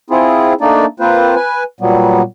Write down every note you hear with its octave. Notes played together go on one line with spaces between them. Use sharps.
C4 E4 F4 G#4
A3 A#3 D4 D#4 D5
A#3 C4 F4 B4 C5
B4 G#5
A#2 F#3 G3 B3